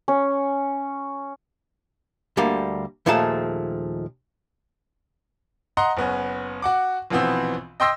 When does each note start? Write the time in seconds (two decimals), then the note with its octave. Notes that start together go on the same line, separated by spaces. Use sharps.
0.08 C#4
2.37 D2 D3 G3 A#3
3.06 D#2 A#2 F3 G#3 A3 A5
5.77 D#5 F#5 A#5 C6
5.97 F#1 B3 C#4
6.62 F#4 F#5 D6
7.10 A#1 B2 E3 B3 C4
7.80 D#5 G5 C6 E6 A#6